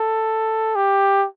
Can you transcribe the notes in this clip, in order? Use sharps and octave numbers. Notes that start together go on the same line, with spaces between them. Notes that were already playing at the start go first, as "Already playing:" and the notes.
Already playing: A4
G4